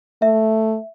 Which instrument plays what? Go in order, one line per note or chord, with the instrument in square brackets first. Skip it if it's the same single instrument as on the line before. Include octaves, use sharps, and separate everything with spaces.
[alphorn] A3 [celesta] E5